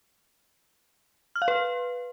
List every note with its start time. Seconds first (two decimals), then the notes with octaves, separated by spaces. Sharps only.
1.36 F6
1.42 F5
1.48 B4